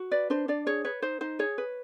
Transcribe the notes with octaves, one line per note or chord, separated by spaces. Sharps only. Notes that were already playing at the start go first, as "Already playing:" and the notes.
Already playing: F#4
B4 D5
D4 C5
D4 D5
G#4 C#5
B4 C#5
D#4 C5
D#4 C5
G#4 C#5
B4